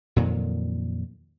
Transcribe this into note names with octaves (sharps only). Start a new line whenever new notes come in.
F2 A#2 D#3 F#3